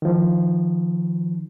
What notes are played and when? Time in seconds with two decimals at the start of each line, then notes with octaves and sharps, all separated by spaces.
0.02 D#3 F3